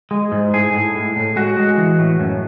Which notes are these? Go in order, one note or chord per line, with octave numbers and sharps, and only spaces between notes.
G#3
G#2
A2 G#4
A2
A2
A2
G#3 F#4
G#3
E3
A2
F#2